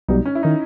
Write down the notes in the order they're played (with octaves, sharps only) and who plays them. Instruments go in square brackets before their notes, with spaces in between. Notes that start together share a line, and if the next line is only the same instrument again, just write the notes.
[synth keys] B1 B2 G3 [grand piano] D#4
[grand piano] C#4
E4
[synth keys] D#3 [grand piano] D#4